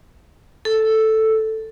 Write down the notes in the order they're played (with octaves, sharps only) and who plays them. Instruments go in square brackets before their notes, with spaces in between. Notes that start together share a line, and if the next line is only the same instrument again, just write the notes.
[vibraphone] A4